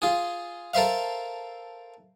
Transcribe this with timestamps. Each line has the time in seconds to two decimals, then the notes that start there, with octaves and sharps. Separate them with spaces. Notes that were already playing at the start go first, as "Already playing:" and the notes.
0.02 F4 G#4
0.74 A4 A#4 C5 E5 F5